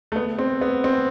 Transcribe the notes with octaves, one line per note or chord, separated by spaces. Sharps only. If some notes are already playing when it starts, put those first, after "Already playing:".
A3
B3
C4
B3
C4